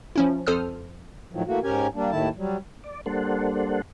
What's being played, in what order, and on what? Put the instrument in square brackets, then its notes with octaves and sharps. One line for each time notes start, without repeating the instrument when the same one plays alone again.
[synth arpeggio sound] F3 C#4 E4
F2 A4 C5 D#6 F6
[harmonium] A2 D#3 F3 F#3
E3 A3 A#3 F#4
G#2 C#4 G4 A#4 G#5
G3 A#3 D4
D#2 A2 D#3 A3 E4 A5
F#3 G3
[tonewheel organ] D5
G3 A#3 D4 A4 C5 F#5